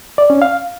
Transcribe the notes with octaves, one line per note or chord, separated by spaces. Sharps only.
D5
C#4
F5